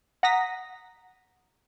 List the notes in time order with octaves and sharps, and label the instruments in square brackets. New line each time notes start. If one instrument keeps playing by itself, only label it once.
[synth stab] F#5 A#5 D#6 A#6 B6